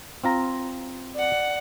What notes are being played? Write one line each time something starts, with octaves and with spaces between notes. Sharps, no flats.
C4 F4 A#5
D5 F#5